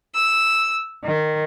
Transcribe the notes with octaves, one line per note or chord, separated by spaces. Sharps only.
E6
D#3